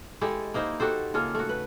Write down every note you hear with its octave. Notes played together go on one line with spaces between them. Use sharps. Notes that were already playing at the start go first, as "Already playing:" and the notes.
G#3 E4 G4 A4
A#3 D#4 E4 C5
F#4 G4 A4 C5
C#3 A#3 F4 A4
A3 F#4
B4